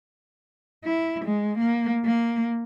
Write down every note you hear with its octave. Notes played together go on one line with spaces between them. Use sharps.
E4
G#3
A#3
A#3